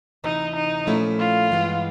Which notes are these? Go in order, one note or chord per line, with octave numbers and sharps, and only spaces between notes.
D2 C3 E3 D#4
D#4
A#2 F3 A3 C#4 E4
F4
G2 E3 G#3 B3